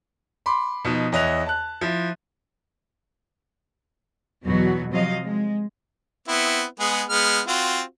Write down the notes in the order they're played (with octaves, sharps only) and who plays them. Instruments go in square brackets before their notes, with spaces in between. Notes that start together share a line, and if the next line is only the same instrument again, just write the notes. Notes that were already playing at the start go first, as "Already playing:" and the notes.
[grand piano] B5 C6 D6
B2 F3 D#4
E2 C#5 D#5 E5 F#6 F7
A5 F#6
F3 E4
[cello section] E2 B2 F#3 F#4
C3 F3 F#3 D#5 F5
G#3
[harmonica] B3 C4 E4
G#3 B3 G#4
G#3 B3 F6
C4 F4 F#4